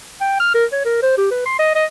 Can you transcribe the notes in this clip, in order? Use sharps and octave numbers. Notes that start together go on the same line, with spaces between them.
G5
F6
A#4
C#5
A#4
C5
G4
B4
C6
D#5
D#5